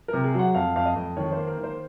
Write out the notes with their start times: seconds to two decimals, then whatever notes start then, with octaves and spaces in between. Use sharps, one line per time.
0.08 A#4
0.13 C3
0.24 G#4
0.34 F#3
0.39 F#5
0.55 F2 F5
0.76 F2 F5
0.86 D#5
0.96 F2
1.17 D#3 C#5
1.32 C5
1.37 A#3
1.47 A#4
1.58 D#3
1.63 C5